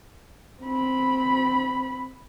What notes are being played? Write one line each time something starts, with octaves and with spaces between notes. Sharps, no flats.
C4 B5